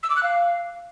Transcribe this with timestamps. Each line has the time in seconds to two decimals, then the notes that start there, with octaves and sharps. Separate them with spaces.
0.03 E6
0.10 D6
0.16 F#6
0.23 F5